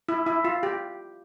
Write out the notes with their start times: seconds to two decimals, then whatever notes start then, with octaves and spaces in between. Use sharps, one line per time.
0.09 E4
0.26 E4
0.45 F4
0.63 G4